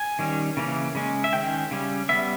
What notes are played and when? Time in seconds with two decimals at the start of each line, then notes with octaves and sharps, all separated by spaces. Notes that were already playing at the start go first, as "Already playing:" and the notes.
Already playing: G#5
0.19 D#3 G3 C#4
0.57 C#3 E3 A#3 C#4
0.95 C#3 G#3 C#4
1.24 E5
1.33 D#3 G#3 C#4 G5
1.71 C#3 G3 C#4
2.09 G3 B3 E5